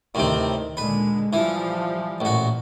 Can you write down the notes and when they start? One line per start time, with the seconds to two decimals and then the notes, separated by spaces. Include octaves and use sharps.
0.15 D2 A2 C3 D#3 C4
0.77 A#2 D3 G#3 B4
1.33 E3 F3 G3
2.21 A1 A#2 F#4